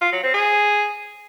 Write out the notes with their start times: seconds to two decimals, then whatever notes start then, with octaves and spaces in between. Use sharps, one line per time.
0.01 F4
0.12 F#3
0.23 C4
0.34 G#4